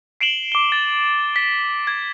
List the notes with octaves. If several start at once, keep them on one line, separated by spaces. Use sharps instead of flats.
C7 D7 E7 F#7 G7
D6 G7
A6
B6
G#6